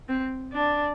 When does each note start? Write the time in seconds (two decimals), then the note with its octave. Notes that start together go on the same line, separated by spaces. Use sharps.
0.08 C4
0.53 D4